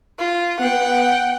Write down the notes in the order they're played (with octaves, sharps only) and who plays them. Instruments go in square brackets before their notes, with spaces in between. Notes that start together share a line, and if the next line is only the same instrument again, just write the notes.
[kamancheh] F4
[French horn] B3 [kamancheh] F#5 G5